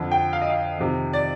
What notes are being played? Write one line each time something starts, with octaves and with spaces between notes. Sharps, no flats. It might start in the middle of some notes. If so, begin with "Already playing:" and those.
Already playing: F2 D3
G5
F5
D#5
F5
F2 C3 D#3
D5